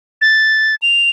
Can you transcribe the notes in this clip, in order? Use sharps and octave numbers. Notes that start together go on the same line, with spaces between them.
A6
F7